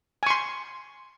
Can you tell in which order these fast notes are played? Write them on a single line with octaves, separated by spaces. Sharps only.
G#5 C#6 C6